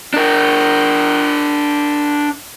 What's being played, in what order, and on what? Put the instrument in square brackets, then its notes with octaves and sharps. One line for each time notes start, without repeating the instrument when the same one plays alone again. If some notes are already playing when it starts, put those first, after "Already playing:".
[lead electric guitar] D4 A#4